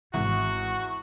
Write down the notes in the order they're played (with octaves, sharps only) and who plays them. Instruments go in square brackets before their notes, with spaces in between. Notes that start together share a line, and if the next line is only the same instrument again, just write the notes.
[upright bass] G#1 E4 [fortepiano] E2 [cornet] F#4 [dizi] C#6